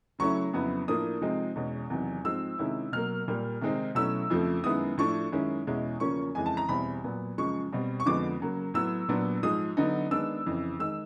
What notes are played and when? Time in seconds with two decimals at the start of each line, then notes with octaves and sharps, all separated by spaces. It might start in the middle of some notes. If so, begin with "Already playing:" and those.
0.19 C#3 F#3 A3 C#4 E4 C#6
0.53 F2 C#3 F#3 B3 E4
0.88 A2 F3 A#3 D4 D#6
1.21 C3 F3 G#3 C4 D#4
1.55 E2 B2 G#3 C#4
1.90 E2 C3 D#3 F#3
2.24 G#2 F3 G#3 C4 E6
2.58 C3 D#3 G#3 C#4 E4
2.92 B2 F#3 A#3 F6
3.28 A#2 G3 A#3
3.61 C3 D#3 G#3 C4 D#4
3.95 B2 F#3 A3 C#4 E4 E6
4.30 F2 C#3 F3 A3
4.64 F#2 D#3 G#3 B3 E4 D#6
4.98 A2 F3 A3 D4 C#6
5.32 F#2 D#3 G#3 C#4 E4
5.67 E2 B2 G#3 C#4 E4
6.00 E2 C#3 F3 A#3 C#4 C#6
6.35 F2 C#3 E3 G#3 G#5
6.46 A5
6.57 A#5
6.69 E2 B2 G3 C4 E4 B5
7.04 A#2 F#3 B3
7.38 F#2 C#3 F3 G#3 C#6
7.72 B2 G3 C4
8.00 C#6
8.06 F2 D3 F3 G#3 B3 D6
8.40 C#3 F#3 A#3
8.74 A2 F#3 B3 E6
9.09 A#2 F#3 B3 D4
9.43 G#2 F3 G#3 D#6
9.77 D3 F#3 B3 D#4
10.11 D#3 G#3 B3 D4 E6
10.45 F2 C#3 E3
10.79 D#3 G#3 E6